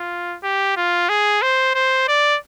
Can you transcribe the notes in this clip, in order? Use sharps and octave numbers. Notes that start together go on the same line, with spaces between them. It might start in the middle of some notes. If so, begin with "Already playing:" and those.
Already playing: F4
G4
F4
G#4
C5
C5
D5